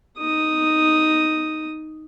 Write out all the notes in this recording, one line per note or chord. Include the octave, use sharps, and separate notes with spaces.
D#4 D#6